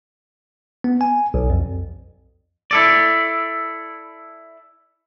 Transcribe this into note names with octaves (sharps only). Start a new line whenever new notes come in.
B3
G#5
B1
F2
E4 A4 D5